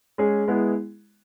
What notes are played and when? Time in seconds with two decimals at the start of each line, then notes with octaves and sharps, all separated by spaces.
0.18 G#3 C#4 G#4
0.48 G#3 B3 E4 G#4